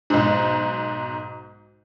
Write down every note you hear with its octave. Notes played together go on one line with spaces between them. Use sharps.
B1 G#2